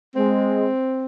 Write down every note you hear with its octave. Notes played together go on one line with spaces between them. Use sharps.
G#3 C4